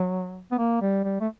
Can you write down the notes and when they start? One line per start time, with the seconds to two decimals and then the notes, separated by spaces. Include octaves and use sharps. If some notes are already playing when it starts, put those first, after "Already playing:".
Already playing: F#3
0.51 B3
0.58 A#3
0.81 G3
1.04 G3
1.21 A3